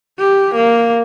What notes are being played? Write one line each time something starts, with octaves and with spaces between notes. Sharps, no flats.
G4
A#3